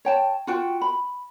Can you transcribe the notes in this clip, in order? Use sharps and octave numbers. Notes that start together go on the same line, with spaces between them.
C#5 G5 A5
F4 F#4 G5
B5